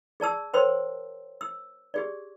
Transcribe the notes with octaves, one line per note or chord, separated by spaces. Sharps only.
G#4 D5 A5 E6
A#4 C5 C#5 G5 C6 E6
E6
G4 G#4 D5